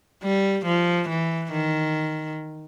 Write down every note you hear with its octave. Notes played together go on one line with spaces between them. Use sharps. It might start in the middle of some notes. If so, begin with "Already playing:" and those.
G3
F3
E3
D#3